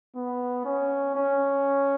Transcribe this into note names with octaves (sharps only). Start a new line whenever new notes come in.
B3
C#4
C#4